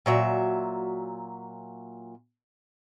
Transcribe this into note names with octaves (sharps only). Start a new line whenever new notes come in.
A#2 F#3 E5